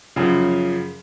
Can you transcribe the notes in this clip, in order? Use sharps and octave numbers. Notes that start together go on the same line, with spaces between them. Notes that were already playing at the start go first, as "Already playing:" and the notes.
F#2 C#3 F3